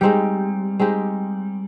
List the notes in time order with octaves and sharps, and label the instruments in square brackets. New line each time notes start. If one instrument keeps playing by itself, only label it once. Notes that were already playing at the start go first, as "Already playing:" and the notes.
[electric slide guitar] G3 [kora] G#3 C4 D#4 G4
[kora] G#3 C4 D#4 G4